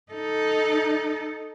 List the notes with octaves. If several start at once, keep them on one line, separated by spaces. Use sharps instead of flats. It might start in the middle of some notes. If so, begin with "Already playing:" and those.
D#4 A4